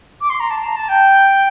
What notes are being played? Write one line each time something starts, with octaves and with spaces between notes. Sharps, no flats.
D6
C6
A#5
A5
A#5
A5
G5